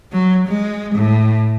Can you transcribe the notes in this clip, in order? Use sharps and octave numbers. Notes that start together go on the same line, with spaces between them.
F#3
G#3
A2